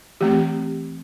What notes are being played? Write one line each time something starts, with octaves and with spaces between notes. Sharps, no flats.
E3 A3 C4 G4